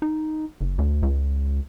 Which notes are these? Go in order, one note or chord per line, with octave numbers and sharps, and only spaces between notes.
D#4
F#1
D2
C#2